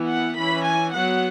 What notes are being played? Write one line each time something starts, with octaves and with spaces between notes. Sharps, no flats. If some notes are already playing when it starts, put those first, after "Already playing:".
Already playing: E3 B3
F#5
E3 C#4 B5
G#5
F#3 B3 F#5